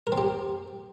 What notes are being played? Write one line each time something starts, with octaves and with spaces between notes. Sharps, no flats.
A#4
C4
G4